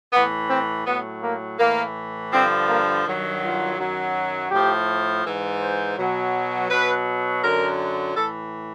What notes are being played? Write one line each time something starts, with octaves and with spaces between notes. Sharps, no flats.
A2 E3 B3
C4
A2 F#3 B3
A#3
A2 E3 A#3
G2 D3 F3 C4
A#3
G2 D#3 F#3
F4
F#2 D#3 F#3
A2 F3 G4
G#2 E3
C5
B2 F#3
B2 F#3 B4
F#2 D3 F#3 A#4
A2 E3 A4